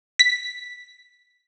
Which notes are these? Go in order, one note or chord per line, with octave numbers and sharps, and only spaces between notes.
B6